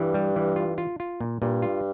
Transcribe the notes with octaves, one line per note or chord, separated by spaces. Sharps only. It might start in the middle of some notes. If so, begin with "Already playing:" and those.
Already playing: G2 E3
G3
E3
F4
F4
F4
A#2
G2 A#2
F4